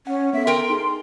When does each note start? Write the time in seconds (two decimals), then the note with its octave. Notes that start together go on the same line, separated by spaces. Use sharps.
0.07 C#4 F#5
0.33 B3 A4 E5
0.47 A#4 G5 C6
0.70 D#4 G#4